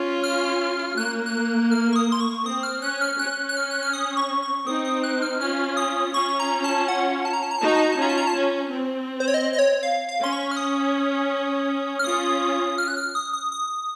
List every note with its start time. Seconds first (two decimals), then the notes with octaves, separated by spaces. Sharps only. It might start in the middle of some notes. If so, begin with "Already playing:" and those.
Already playing: C#4 F4
0.23 F6
0.98 A#3 F#6
1.26 F#6
1.72 F6
1.92 C#6
1.96 D#6
2.12 C6
2.20 C#6
2.45 C4 D#6
2.63 F6
2.82 C#4 F#6
3.01 F6
3.19 C#4 F#6
3.49 F#6
3.57 F6
3.71 F#6
3.83 F6
3.93 D#6
4.17 C#6
4.42 C#6
4.67 C4 D#4 D#6
4.85 D#6
5.04 F#6
5.22 F6
5.40 C#4 F4 F6
5.77 D#6
6.14 C#4 F4 C#6
6.40 A#5
6.64 A5
6.88 F#5
7.25 A5
7.33 A#5
7.43 A5
7.51 A#5
7.58 D#4 F#4 A5
7.68 A#5
7.75 A5
7.84 A#5
7.92 A5
7.99 C#4 F4 A#5
8.09 A5
8.18 A#5
8.27 A5
8.36 C#4
8.73 C4
9.20 C5
9.28 C#5
9.34 D#5
9.53 D#5
9.59 C#5
9.83 F5
10.09 F5
10.20 C#4 C6
10.33 C#6
10.51 F6
10.57 D#6
11.99 F6
12.04 C#4 F4 D#6
12.78 F6
12.88 F#6
12.97 F6
13.15 D#6
13.33 D#6
13.52 D#6